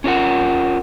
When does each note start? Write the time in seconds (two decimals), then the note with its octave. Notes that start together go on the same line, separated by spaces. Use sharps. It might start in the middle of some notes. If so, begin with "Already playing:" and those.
0.04 C#4 F4 A#4 F#5